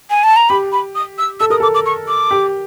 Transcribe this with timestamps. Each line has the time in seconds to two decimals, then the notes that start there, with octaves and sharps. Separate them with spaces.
0.10 G#5
0.24 A5
0.36 A#5
0.49 G4 B5
0.72 B5
0.95 D#6
1.18 E6
1.40 A4 E6
1.50 A#4 D#6
1.60 A4 D6
1.75 D6
1.86 C#6
2.08 D6
2.31 G4